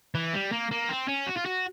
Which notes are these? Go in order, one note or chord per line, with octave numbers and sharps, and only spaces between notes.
E3
G3
A#3
A#3
C4
C#4
F#4
F4
F#4